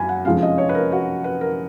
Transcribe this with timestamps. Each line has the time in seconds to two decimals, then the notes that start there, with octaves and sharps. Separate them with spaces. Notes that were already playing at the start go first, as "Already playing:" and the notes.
Already playing: F#2 G#5 B5
0.09 F#5
0.25 F1 F2 F3 G#3 C#4 F5
0.43 D#5
0.58 C#5
0.69 B4
0.75 A#4
0.92 F#4
1.24 B4
1.41 A#4